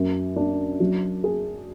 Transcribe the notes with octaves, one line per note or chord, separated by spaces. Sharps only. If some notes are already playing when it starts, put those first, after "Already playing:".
Already playing: F#2
D4
F#3
G#4